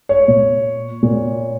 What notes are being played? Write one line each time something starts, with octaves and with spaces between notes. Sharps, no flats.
C#5
A#2
A#2